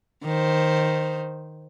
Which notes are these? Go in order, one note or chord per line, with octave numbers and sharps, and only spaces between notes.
D#3 C5